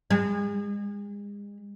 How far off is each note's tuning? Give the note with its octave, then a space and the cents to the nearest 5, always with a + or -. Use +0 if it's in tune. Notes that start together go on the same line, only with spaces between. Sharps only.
G#3 -35